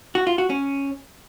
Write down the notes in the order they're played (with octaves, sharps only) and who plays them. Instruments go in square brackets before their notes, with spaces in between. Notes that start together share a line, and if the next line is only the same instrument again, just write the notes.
[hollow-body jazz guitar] F#4
F4
F#4
C#4